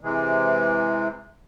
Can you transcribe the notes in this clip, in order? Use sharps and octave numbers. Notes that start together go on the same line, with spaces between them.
C3 E3 G#3